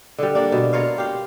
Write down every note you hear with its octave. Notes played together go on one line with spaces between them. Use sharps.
D3 G3
A#3 D4
B2
F4 A#4 C#5 F5
G4 F5